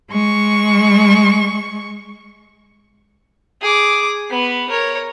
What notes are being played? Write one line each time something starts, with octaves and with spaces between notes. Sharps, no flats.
G#3 C#6
G#4 D6
B3 B4
A#4 C#5